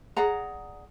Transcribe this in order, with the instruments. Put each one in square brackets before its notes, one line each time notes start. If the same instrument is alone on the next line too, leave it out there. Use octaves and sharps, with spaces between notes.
[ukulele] G#4 D5 F#5 A#5